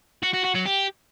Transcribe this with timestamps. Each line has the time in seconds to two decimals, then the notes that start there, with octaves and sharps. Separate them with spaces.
0.23 F#4
0.34 F#4
0.45 F#4
0.55 F#3
0.66 G4